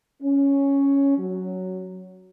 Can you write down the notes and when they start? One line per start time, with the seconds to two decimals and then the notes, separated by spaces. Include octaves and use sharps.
0.23 C#4
1.18 F#3